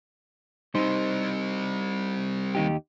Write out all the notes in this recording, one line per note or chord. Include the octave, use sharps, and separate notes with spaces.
G3 C4 D#4 C5
D#2 D#4 G4